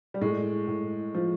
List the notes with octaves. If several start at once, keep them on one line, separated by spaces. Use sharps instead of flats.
G3
A2 G#3
A2
F3